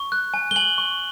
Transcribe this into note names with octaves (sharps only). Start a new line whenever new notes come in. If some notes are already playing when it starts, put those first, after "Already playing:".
Already playing: C#6
F#6
G#5
G7
G#5 F#7
C#6